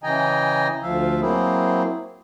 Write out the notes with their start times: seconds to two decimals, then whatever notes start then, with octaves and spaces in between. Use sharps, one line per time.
0.03 C#3 E3 D#5 G5 G#5 A#5
0.83 D2 F3 E5 F5
1.21 F#3 A#3 C4 E4 G#4